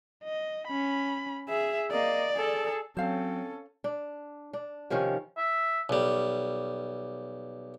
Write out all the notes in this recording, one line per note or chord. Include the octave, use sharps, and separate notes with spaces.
D#5
C#4 B5
G#4 E5
A#3 D5 D#5
G#4 A4
F#3 C4 C#4 A4 C5 F5
D4
D4
C3 D#3 F3 C#4
E5
B1 G3